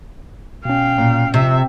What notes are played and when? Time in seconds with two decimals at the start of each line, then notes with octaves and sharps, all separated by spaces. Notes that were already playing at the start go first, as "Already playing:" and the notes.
0.65 B2 C#4 F5 G5
0.98 A#2
1.34 C3 F3 E5